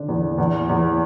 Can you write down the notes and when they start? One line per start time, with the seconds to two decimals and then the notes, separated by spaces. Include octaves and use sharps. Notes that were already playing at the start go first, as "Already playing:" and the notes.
Already playing: D3 D4
0.08 E2
0.38 E2
0.69 E2